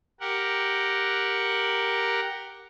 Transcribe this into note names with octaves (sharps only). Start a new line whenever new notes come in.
G4 A#4 F#5